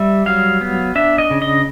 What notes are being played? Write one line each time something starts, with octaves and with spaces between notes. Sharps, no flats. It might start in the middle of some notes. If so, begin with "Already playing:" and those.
Already playing: G3 E5
F#3 F5
B3
D4 E5
D#5
C#3
D#5